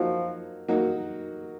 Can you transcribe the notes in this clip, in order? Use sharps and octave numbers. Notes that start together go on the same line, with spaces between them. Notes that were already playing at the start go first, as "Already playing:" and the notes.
Already playing: F3 F#3 A#3 D#4 F#4
F#3 A#3 D#4 F#4